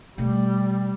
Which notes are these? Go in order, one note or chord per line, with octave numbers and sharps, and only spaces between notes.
B2 G3 A3